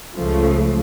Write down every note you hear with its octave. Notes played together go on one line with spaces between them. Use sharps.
C#2 C#3 F3 A3